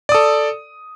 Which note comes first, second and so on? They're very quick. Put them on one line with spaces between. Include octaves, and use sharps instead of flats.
D5 D#6 A4